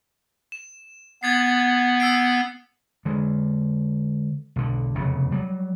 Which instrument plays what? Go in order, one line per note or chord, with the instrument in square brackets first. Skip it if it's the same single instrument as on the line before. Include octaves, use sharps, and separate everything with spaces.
[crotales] E7
[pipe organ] B3 [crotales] G#6 A6 C7
[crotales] E6 C7 D7
[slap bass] D3 G#3
B1 D3
F1 E2 C#3
F#3 G3